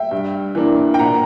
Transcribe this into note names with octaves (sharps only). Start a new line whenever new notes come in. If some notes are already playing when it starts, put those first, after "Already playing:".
Already playing: E5 G5
G2
E3 A#3 D4
G5
A#2 F#5 A#5